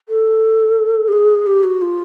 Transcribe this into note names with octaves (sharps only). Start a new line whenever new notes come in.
A4
G4
G#4
G4
F#4
F4